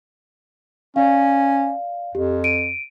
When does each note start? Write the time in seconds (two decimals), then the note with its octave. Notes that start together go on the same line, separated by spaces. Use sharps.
0.96 C#4 D5 F5
2.15 F2 G4
2.44 D7 D#7